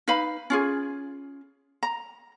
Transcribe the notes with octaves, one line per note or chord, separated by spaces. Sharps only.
D#4 B4 F5 B5
C#4 F4 G#4
A#5